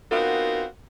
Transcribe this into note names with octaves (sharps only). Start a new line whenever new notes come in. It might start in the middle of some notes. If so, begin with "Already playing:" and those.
B3 C4 D#4 F4 F#4 A#4